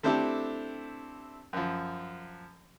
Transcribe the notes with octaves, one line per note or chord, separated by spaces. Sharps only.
A3 C4 D4 E4 G4 A4
F#2 F3